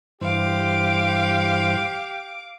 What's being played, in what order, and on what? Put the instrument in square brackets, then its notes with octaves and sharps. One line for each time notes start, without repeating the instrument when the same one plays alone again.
[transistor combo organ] G2 E3 C5 [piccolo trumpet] G4 [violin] F5 D6